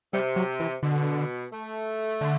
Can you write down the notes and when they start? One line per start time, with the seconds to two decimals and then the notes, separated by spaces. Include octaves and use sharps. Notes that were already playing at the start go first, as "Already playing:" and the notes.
0.13 C3 G3
0.36 F#3
0.60 E3
0.83 B2 D3
1.52 A3
2.21 D3